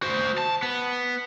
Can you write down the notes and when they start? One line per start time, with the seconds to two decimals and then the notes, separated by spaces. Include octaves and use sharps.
0.02 F#4 C5
0.38 A5
0.63 B3